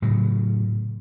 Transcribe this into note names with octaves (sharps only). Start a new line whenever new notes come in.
A2 C#3 F#3